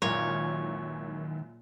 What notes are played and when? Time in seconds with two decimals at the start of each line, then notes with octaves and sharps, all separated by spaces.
0.02 C#2 F#2 A#2 D#3 E3 F4 A#4 C#5